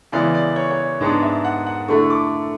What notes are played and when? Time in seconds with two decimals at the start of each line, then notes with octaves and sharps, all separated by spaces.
0.12 C#3 E3 G#3 B3 D5
0.34 D5
0.56 C#5
0.71 C#5
1.01 G#2 G#3 B3 D4
1.22 E5
1.45 F#5
1.66 F#5
1.88 D3 A3 E4 C#6
2.10 D6